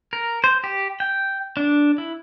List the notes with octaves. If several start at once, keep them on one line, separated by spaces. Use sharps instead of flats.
A#4
C5
G4
G5
D4
E4